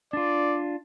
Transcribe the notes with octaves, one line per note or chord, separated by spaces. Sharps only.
D4 F4 D5